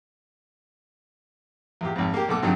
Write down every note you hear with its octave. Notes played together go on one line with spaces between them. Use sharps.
E2 A#2 G4
G#1 F2
A#3 G4
B1 B2 A4 D6
G2 A#2 D3 F#3 C4 D#4